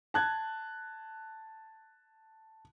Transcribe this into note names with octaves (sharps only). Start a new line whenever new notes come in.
A5 F#6 G#6